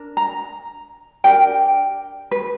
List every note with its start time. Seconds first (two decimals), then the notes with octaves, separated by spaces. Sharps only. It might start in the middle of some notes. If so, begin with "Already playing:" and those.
Already playing: D4 A#4
0.17 A#5
1.24 D4 G4 A#4 G5
2.31 B4